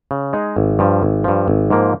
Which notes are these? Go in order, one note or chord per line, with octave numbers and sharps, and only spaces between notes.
C#3
G#3 D#4 G#4
G#1
G2 F3
G#1
G2 F3
G#1
G#2 F3 A#3